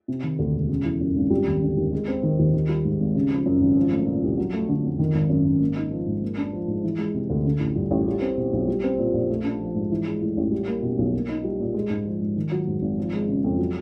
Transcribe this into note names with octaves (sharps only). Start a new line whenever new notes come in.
C3
D#3
D2
E1
C#3
E3
F#2
G#1
G3
D#2
D3
D#2
G#3
C4
D#3
D#2
D#3
G3
G#2
G#1
C#3
F3
F#2
G#1
F3
A3
A#2
C2
F#3
A3
D3
F2
D#3
G#1
F#2
G#1
A#3
D#4
F3
G#2
A#3
D4
F3
G#2
E3
G#3
C3
D2
D3
A1
G2
A1
G3
C4
B2
B1
G3
C4
A#2
A#1
A3
D4
F3
G#2
E3
G#3
A2
A1
G3
A#3
B2
B1
A#3
D#4
G3
A#2
G#3
G#2
F3
G#2
D#3
F#3
G#2
G#1
F3
G#3
C#3
F2
F#3